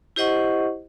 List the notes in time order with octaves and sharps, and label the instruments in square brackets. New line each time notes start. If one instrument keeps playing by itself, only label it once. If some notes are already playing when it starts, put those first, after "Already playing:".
[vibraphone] E4 G4 C5 D#5 F#5 C#6